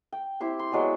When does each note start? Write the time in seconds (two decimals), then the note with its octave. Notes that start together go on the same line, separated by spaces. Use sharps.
0.12 G5
0.40 C4 E4 G4 C5
0.59 C6
0.72 F#3 G#3 B3 D5